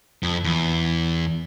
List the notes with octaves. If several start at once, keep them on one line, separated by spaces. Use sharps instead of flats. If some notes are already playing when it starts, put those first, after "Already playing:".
F2
E2